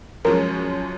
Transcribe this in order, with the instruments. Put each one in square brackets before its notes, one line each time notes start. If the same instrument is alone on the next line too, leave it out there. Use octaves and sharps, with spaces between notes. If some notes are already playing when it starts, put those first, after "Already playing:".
[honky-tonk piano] F#2 F3 G#3 C#4 [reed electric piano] A#4